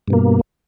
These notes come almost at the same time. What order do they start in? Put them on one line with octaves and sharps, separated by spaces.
G2 B2 A#3